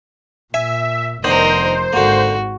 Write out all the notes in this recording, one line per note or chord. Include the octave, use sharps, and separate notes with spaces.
A#2 E5 G#5
F1 D#3 B3 D4 A#4 C5 D#5
G#1 G#2 D3 A#3 F#4